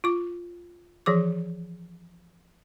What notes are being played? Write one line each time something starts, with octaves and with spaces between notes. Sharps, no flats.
F4 D6
E3 F3 G#4 D6